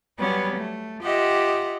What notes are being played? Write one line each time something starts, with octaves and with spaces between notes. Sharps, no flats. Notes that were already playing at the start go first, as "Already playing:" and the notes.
F#3 G3 B3 C#4 B4
A3
F4 G4 D#5 E5 F#5